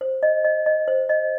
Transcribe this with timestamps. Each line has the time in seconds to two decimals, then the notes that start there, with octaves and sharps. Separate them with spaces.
0.01 C5
0.23 D#5
0.45 D#5
0.66 D#5
0.88 C5
1.09 D#5